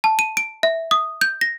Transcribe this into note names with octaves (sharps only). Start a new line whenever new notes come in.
A5
D#7
D7
E5
D#6
G6
A#6